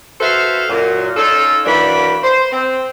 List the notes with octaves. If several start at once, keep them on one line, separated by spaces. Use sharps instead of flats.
F#4 A4 B4 C5 E5 F5
F#2 A#2
C#4 D#4 F4 A4
F#2 E3 A#3 D4 F#4 B5
C5
C4